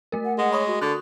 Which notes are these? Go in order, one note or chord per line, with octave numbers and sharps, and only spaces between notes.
A3 A#4
F#5
G#3 F#5
C#5 B5 C#6 D#6
F#4
D3 F#6